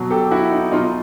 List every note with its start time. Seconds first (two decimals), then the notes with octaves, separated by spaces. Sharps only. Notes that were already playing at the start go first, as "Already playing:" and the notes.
Already playing: B2 F#3
0.11 G4 A4
0.31 E4 F#4
0.52 D#4
0.72 B2 F#3 D#4 F4